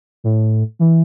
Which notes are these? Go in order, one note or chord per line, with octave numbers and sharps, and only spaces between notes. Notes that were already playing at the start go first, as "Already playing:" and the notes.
A2
E3